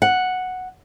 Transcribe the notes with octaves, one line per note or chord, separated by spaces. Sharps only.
F#5